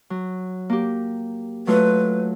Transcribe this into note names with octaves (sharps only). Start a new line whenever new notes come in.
F#3
A#3 G4
F#3 A3 F4 B4